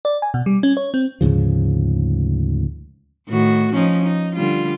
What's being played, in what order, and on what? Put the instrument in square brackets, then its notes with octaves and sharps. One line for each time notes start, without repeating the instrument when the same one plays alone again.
[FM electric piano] D5
G#5
B2
G3
C#4
C#5
C4
[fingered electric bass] D2 G#2 C#3 F3
[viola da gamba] A2 D#3 F#4
F3 C#4 D#4
D#4
D3 G3 F4